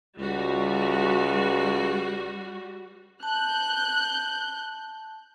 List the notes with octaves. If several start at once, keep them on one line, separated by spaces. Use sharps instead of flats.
C#2 G3 F#4
A5 F#6 G6